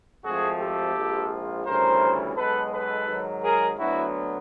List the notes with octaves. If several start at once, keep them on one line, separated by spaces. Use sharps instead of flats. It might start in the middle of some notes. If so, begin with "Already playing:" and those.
G#1 G#2 F3 A3 C4 F#4 G#4
G4 A4
A#1 G#2 F3
D2 C#3 E3 G3 A#4 C5
B1 B2 G#3 B3 A4 B4
A4 B4
G#2 D#3 F#3
G#4 A#4
D2 D3 F#3 B3 E4 F#4